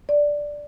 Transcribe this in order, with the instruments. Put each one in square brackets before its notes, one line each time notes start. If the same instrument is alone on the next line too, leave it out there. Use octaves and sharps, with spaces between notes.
[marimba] D5